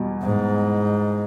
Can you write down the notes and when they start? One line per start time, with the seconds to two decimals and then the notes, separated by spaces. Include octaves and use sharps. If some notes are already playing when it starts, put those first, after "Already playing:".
Already playing: E2 B2 G3
0.23 G#2